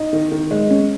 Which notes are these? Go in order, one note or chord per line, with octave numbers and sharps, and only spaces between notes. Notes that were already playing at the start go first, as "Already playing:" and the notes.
Already playing: D#4
D#3
D#3
G#3
C#4